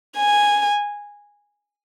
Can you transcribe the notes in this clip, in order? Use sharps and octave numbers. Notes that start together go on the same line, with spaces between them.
G#5